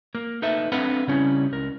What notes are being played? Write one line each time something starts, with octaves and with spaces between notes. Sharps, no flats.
A#3 A#4
D#4 A4 B4 E5
C4 D4 A4 B4 F5 F#5
C#3 G3 C#4 E4
C#2 A#4